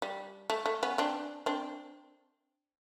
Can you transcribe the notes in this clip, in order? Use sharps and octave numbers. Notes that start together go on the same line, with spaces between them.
G3
A3
A3
B3 C#4
C4 D4
C4 D4